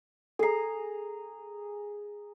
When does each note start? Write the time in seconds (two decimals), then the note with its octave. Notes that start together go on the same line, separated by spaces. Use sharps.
0.39 G#4 A4 A#5 C7